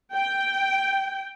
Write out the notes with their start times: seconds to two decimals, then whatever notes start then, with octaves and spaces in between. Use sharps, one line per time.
0.15 G5